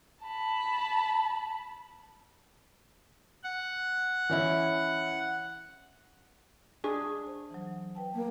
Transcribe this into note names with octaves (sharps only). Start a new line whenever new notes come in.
A5 B5
F#5
E3 C#4 E4
D4 G#4
C5
E3 F#3
B4 G5 A5
A#3